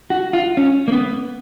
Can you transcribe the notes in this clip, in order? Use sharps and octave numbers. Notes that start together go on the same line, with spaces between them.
F#4
F4
C#4
A#3
B3